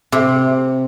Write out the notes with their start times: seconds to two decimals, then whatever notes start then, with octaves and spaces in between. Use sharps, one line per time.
0.12 C3